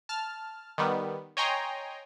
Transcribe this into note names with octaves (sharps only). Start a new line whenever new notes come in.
A5 F6
D#3 G3 B3
C#5 D#5 G5 G#5 A#5 C6